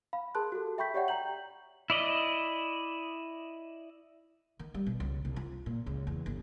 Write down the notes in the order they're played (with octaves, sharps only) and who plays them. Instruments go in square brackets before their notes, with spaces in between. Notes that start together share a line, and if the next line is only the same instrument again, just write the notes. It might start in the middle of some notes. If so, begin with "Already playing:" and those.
[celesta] F5 B5
G#4 A#4 A5 C6 F#6
F#4 G4 A4
E5 G5 B5 C#6 G6 B6
G4 C#5 D5 E5 F#5 G5
G5 A#5 G6 F#7
[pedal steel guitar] E4 D5 D#5
[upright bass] D#3
G3
B2
C#2
C2
F4
A#2
C#2
E2
G1